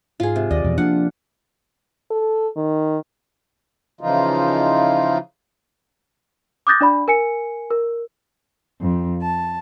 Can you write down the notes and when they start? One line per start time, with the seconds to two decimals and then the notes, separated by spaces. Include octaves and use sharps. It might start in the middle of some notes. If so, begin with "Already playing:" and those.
0.20 G#2 F4 G#4
0.36 C3
0.51 D#2 D5 D#5
0.64 E2 B2 F3
0.78 F3 A#3 D4 F4 F#5
2.10 A4
2.56 D#3
4.01 C#3 E3 F3 D#4 F4
6.67 D6 D#6 F#6 G6 A6 A#6
6.81 D4 D5 B5
7.08 A#4 G#5 C#7
7.71 A#4
8.80 F2
9.22 A5